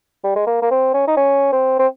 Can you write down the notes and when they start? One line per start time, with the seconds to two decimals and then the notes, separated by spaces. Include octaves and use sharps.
0.24 G3
0.35 G#3
0.47 A#3
0.62 A#3
0.71 C4
0.94 C#4
1.07 D#4
1.17 C#4
1.52 C4
1.79 C4